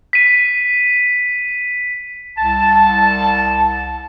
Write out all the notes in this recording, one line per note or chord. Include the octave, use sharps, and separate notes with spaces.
B6 D#7
C2 A5